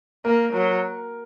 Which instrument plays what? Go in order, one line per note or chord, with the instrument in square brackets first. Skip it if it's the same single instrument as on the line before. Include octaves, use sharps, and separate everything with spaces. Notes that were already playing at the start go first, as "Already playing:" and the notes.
[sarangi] A#3 [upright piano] A#4
[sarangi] F#3